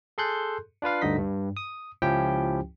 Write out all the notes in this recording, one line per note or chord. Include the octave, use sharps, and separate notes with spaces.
G#4 A4 C6 F#6 G6
D4 F4 B4 F5
D2 G2 D3 D#4 D#5 B6
G2
D#6
C#2 F3 C#4 E4 G4 G5